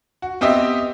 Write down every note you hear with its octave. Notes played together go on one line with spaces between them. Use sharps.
F#4
B3 C4 G4 D#5 E5